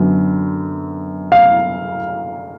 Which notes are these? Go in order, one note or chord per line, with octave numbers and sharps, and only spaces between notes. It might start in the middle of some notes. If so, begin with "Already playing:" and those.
Already playing: F#2 D3 F#3 B3
F5